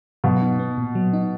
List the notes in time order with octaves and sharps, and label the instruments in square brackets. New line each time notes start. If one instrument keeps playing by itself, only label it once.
[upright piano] B2 [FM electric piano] F#3
[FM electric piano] D#4
B3
A#2
F#3
D#4